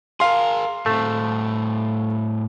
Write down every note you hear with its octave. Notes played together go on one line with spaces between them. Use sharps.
G#4 A#4 F5 C6
A2 A3 C4